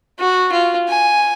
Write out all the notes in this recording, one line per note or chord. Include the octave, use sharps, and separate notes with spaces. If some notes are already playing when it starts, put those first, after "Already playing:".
F#4
F4
G#5